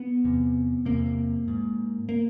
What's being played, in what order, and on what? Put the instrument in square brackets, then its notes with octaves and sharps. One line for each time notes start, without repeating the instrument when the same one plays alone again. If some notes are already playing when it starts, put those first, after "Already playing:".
Already playing: [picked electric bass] B3
E2 C3
E2 C3 A#3
G#2
A#3